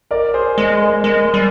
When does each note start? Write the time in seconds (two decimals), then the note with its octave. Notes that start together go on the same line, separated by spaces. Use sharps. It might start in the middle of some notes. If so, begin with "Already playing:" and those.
0.11 A#4 D5
0.34 G#4 C5
0.58 G#3 G#4
0.80 A#4
1.03 G#3 A#4
1.34 G3 G#4